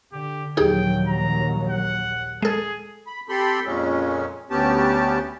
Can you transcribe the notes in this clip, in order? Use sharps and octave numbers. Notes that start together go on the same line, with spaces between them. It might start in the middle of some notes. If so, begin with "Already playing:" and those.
D3 G4
A#1 D#2 F#3 D#4 G4 G#4 G5
A#5
F#5
G#3 G#4 A4
B5
C4 G4 A4 B5 C6
F2 A#2 G#3 C#4
D2 B3 C#4 G4 A5